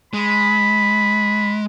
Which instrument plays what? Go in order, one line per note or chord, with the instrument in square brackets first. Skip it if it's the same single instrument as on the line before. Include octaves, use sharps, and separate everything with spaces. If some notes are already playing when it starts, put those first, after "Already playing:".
[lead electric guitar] G#3 [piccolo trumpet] B5